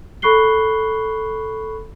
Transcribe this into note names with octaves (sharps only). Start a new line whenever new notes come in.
A4 B5 C#6 F#6 C7 G7